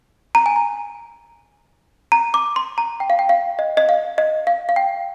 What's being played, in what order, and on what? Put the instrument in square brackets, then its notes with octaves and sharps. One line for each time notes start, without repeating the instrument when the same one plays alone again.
[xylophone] A#5
G#5
A#5
A#5
D6
C6
A#5
G5
F5
G5
F5
D#5
D#5
F5
D#5
F5
F5
G5